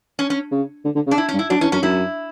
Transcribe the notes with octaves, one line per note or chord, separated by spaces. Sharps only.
C#4
C#4
C#3
D3
D3
C#3
D4
E4
C#4
G2
E4
F#3 D4
E3 C#4
F#2 C#4
F#2 E4